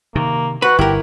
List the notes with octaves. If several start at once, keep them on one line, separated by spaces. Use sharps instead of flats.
C3 D#3 A#3
F#4 B4
G1 E4 G4 A#4